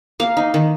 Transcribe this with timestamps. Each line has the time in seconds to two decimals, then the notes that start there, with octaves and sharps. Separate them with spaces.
0.20 A#3 F5
0.37 D#4
0.54 D#3